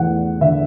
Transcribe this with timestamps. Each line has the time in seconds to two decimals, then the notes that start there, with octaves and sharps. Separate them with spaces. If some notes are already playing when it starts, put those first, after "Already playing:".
Already playing: E2 A3 F#5
0.41 D3 E5